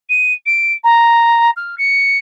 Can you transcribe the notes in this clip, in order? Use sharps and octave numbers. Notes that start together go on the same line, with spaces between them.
D#7
D7
A#5
F6
C#7